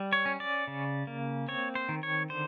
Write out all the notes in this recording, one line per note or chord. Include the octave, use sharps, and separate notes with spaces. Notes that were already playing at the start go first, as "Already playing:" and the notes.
Already playing: G3
C#5
C#4
D5
C#3
A#3
C4 C#5
C5
D#3
C#5
D3 C5